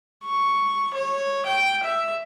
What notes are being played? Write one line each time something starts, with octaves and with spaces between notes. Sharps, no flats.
C#6
C#5
G5
E5